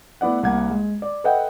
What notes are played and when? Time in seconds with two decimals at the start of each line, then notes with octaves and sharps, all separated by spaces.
0.21 A3 B3 E4 D5 F#5
0.43 C2 A#3 F#5 G#6
0.70 G#3
1.02 D5
1.24 A4 B4 D#5 E5 F#5 G5